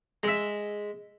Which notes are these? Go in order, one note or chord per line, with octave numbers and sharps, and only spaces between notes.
G#3 E5